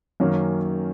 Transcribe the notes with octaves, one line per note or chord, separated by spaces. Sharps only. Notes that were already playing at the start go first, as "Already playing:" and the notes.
F#2 D#3 F#3 A#3 C#4